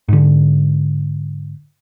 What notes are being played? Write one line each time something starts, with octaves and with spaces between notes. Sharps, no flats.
G#2 D3